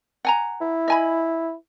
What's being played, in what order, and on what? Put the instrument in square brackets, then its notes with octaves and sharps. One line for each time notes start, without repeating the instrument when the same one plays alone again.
[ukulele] F#5 G#5 A#5
[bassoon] E4
[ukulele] D#5 G#5 B5